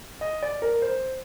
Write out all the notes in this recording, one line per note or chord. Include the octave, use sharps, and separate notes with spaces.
D#5
D5
A#4
C5